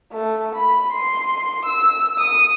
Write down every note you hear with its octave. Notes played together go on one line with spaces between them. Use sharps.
A3
B5
C6
E6
D#6